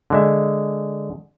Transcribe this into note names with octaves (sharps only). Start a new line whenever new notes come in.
D3 G#3 E5